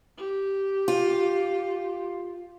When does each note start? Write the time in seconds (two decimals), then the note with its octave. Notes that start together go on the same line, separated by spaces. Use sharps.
0.17 G4
0.88 F4